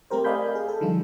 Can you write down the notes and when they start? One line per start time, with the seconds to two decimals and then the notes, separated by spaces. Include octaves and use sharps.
0.11 A3 C4 G4 A#4 C5
0.24 D5 D#5 F5 G#5 B5 G6
0.55 G#4
0.68 A4
0.81 D3 F3 G3 D#4 F4